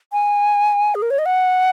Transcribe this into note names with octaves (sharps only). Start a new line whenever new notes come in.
G#5
G#4
A#4
C#5
D#5
F#5